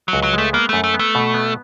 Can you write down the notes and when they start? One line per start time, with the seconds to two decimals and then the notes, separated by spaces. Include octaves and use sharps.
0.08 F#3
0.13 C#2
0.23 F#3
0.34 G#3 A3
0.53 A#3 B3
0.69 F#2 A3
0.84 A3
0.94 B3
0.99 A3
1.15 B2
1.34 B3